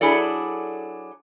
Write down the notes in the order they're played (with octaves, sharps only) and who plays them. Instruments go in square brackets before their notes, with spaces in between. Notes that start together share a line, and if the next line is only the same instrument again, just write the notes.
[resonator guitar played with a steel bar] F#3 D4 E4 G#4 A4 D5